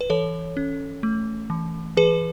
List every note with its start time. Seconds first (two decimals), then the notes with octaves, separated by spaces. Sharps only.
0.01 B4
0.10 E3 A4 C#5
0.57 C#4
1.03 A3
1.50 E3
1.97 E3 G#4 B4